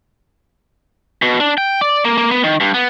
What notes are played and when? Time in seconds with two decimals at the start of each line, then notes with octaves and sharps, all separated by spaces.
1.22 B2
1.40 D4
1.58 G5
1.81 D5
2.05 A#3
2.18 A#3
2.31 B3
2.44 D#3
2.61 G2
2.74 B3